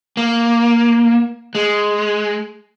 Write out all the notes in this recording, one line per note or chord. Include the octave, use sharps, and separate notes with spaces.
A#3
G#3